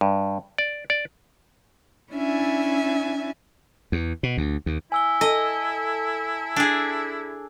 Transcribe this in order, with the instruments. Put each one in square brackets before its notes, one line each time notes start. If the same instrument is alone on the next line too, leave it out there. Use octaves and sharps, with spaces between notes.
[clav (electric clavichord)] G2
D5
D5
[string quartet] C#4 D4 E4 E5 G#5
[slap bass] E2
B2
D2
D#2
[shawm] E4 [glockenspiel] G#5 E6 G7
[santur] A4 [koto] D#5
[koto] D4 G#4